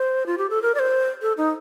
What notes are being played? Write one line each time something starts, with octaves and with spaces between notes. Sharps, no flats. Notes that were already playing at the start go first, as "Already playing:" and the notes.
Already playing: C5
F4
G4
A4
A#4
D5
C5
A4
D#4